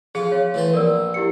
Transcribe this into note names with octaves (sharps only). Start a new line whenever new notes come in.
F3 F4 G#4
C#5 F5
A2 E3 C5
A#1 A#4 D5 E6
E4 G4 C#7